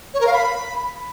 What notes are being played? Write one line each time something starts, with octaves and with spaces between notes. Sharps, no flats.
C#5
A#4
F5
B5